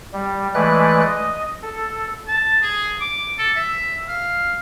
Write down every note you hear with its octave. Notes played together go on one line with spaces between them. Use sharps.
G3
E3 G#3 A3 B4 D5 F#6
D#5
A4
A5
G#4
D6
A4
E5
F5